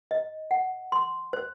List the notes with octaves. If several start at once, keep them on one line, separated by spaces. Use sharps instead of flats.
D#5
F#5
C6
C5